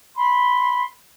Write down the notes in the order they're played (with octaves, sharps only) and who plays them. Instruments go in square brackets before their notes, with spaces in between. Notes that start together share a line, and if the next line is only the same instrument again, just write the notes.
[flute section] B5 C6